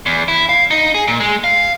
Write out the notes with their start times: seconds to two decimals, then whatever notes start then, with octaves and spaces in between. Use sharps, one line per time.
0.06 E2
0.28 E4
0.49 F5
0.71 D#4
0.94 G#4
1.08 A#2
1.20 G#3
1.44 F5